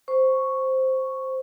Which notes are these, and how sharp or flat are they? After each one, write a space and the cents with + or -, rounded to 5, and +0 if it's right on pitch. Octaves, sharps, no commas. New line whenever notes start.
C5 +0 C#6 +0